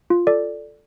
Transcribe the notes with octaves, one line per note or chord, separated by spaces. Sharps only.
F4
A4 D5